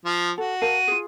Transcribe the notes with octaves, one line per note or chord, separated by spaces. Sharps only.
F3
F#4 A4
A#4 F5 A5 D#7
F4 G#4